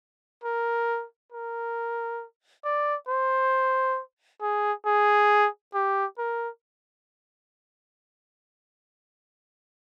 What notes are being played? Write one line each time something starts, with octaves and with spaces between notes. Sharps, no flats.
A#4
A#4
D5
C5
G#4
G#4
G4
A#4